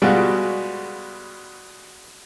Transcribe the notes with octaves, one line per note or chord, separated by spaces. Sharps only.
B2 G3 G#3 F4 F#4